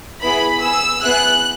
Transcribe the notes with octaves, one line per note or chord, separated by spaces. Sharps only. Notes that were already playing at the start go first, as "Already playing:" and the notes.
B3 E4 G#4 B5
B3 G#4 E6
B3 E4 G#4 F#6